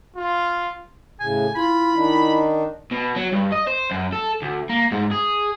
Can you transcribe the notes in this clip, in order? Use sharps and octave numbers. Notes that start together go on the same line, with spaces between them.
F4
A2 C#3 G#5
E4 F4 B5
D#3 D4 D#4
B2
F#3
G2
D#5
C5
F#2
A4
D2
A#3
G#2
G#4